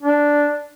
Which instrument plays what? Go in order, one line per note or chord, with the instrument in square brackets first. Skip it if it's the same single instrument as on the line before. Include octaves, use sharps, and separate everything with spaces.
[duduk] D4